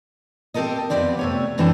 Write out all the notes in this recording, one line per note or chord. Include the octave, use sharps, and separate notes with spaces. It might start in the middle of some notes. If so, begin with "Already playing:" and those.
C4 G4 A4 A#4 D#5
F2 D#3 B3 C4 G4 D5
C3 A3 C#5
F#2 E3 C4 D4 G4 A4